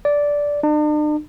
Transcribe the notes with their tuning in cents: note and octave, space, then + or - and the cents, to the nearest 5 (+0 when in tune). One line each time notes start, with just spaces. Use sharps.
D5 -10
D4 +45